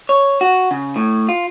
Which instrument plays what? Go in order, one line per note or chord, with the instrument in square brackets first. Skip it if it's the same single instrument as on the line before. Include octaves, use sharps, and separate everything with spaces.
[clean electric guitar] C#5
F#4
C#3
A2
F4